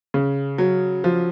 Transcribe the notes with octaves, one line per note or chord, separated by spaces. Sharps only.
C#3
F#3
F3